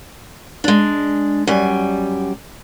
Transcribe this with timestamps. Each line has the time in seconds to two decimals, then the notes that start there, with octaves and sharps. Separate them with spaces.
0.64 G#3 D4
1.47 F#2 G3 G#5